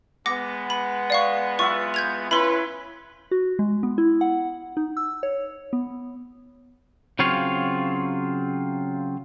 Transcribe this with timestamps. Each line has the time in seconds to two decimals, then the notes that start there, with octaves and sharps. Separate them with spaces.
0.26 G#3 B3 F#5 D6 A#6
0.70 B5
1.10 D5 F5 C#6
1.59 F4 E5 F#5 C#6
1.94 G6 G#6 F7
2.31 C#4 E4 B4 B5 C6
3.31 F#4
3.59 G#3
3.83 B3
3.98 E4
4.21 F#5
4.77 D#4
4.97 E6
5.23 C#5
5.73 B3
7.19 C#3 F#3 C4 F4 C#5 F5